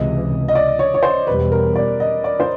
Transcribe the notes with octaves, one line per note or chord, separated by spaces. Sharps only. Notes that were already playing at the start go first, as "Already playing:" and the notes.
Already playing: C#2 C3 E3 D#5
D#5
D5
C#5
C#5
C5
E2 B2 G3 B4
A#4
D5
D#5
D5
C5